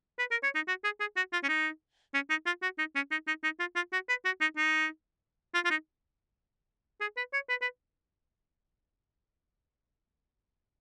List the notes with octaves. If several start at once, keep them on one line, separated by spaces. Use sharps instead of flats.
B4
A#4
C#5
D#4
F#4
G#4
G#4
F#4
F4
C#4
D#4
C#4
D#4
F4
F#4
D#4
C#4
D#4
D#4
D#4
F4
F4
F#4
B4
F#4
D#4
D#4
F4
F4
D#4
G#4
B4
C#5
B4
B4